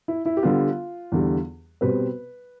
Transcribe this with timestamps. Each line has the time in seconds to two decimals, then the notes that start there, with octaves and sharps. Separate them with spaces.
0.08 E4
0.26 E4
0.37 G4
0.43 D3 G3 B3 F4
1.12 E2 D3 G3
1.81 B2 G3 C4 B4